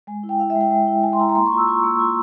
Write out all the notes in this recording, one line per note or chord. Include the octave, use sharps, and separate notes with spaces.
G#3 G#5
E4
G5
E4 F5
E5
G#3
G5
G#3
E4
G#3 G#5
C6
E4 A#5
A#5
A#3 C6
C#6
F4
E6
F4 C#6
A#3 E6
C#6
F4 C6